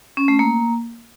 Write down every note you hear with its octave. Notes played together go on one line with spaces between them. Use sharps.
C#4
A3
A#3